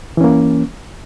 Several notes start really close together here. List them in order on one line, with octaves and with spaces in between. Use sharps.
E3 C#4 A#3